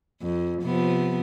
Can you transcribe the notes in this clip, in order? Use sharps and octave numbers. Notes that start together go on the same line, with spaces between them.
F2
C3 F3 B3